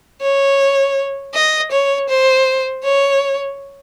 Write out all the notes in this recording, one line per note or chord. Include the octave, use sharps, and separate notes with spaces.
C#5
D#5
C#5
C5
C#5